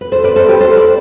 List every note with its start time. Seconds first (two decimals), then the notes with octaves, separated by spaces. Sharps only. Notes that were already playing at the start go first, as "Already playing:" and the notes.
0.01 B4
0.12 A4 C5
0.24 B4 D5
0.36 A4 C5
0.48 G4 B4
0.60 A4 C5
0.77 B4 D5